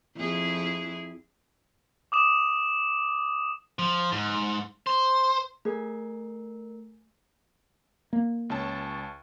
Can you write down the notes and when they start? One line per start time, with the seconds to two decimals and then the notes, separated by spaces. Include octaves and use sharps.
0.16 F2 E4 G#4
2.12 D6 D#6 E7
3.79 F3
4.12 G#2
4.87 C5
5.65 A3 G#4 A#4
8.13 A#3
8.50 C#2 C#4 A5